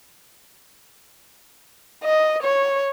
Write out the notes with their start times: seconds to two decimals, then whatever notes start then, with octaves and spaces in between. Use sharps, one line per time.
2.04 D#5
2.43 C#5